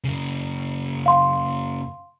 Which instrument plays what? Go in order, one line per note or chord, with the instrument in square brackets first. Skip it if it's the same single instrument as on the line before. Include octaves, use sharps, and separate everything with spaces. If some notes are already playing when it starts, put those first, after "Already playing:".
[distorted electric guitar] F#2 C#3
[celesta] F5 C6